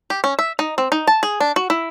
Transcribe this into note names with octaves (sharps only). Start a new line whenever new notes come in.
G4
C#4
E5
D#4
C4
D#4
A5
G#4
D4
F#4
E4